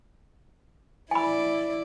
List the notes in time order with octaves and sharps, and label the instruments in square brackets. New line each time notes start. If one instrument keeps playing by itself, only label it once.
[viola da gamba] E4 D5 [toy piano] G#5 B5